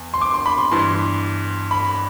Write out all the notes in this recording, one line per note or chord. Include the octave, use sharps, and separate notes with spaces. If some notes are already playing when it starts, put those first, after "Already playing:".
Already playing: E2
C6
D6
C6
B5
C6
G2 E3 C6
B5